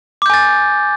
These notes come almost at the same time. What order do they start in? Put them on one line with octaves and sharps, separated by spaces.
D6 G6 G#5 A6